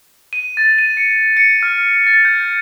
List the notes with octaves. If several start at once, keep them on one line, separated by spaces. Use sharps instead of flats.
D#7
A6
D#7
C#7
C#7
F6
A6
G6